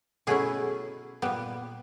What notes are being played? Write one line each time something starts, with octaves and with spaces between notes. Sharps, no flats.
B2 F#3 A3 C#4 E4 G#4
A#2 G3 B3